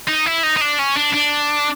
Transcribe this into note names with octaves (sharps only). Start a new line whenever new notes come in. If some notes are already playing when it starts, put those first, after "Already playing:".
D#4
E4
D#4
D#4
D4
C#4
D4
D4